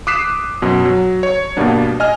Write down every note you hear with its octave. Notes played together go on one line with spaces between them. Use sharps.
D6 D#6 F#6 B6 C7 E7
F#2 B2
F#3
C#5
G2 B2 G3 A#3 B3 D4
D#5 G#5 F6